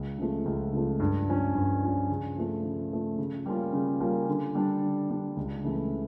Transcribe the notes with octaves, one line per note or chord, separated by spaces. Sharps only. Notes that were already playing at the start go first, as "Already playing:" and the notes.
Already playing: C#2
C#3 F3 A3
C#2
C#3 F3 A3
G2
F3 C#4
G2
F3 C#4
C#3
F3 A3
C#3
F3 A3
C#3
G3 A#3 C#4 F4
C#3
G3 A#3 C#4 F4
D3
G3 D4
D3
G3 D4
C#2
C#3 E3 A3 E4